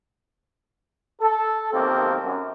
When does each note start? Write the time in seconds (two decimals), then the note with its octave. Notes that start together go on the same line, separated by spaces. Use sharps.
1.21 A4
1.73 B1 D#3 F3 A#3 C4 G4
2.23 F#2